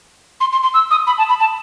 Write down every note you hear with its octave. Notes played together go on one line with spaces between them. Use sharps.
C6
C6
C6
E6
D#6
B5
A5
B5
A5